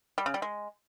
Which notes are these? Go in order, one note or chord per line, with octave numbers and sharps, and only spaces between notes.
G3
C#3
G3
G#3